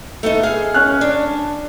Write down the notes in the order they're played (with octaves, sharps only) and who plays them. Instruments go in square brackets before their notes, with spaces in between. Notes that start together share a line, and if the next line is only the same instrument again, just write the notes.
[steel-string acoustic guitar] A3 B3 D#4
G#4 F5
[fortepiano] C#4 F6 F#6
[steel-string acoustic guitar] D4